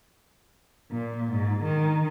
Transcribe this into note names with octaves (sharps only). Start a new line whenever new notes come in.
A#2
G#2
D#3